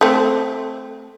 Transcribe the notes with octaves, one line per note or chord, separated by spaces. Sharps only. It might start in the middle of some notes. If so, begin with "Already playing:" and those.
A3 C4